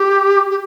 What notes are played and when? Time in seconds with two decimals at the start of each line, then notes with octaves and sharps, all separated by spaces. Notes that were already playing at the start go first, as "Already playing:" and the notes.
Already playing: G4
0.50 G4